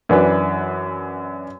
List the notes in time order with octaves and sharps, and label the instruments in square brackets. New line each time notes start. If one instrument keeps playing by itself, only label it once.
[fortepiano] F#2 E3 D4 B4